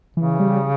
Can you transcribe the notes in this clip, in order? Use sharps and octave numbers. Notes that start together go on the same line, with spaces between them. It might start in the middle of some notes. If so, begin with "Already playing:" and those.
C#3 E3
G3